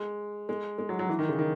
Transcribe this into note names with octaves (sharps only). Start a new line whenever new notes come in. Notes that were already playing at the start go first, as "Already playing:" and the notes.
Already playing: G#3
G#3
G#3
F#3
F#3
E3
D#3
C#3
D#3